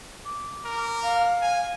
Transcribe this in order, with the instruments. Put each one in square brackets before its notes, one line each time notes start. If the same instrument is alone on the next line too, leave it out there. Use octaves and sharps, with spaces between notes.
[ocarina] D6
[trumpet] A#4
[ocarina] F5
[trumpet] G#5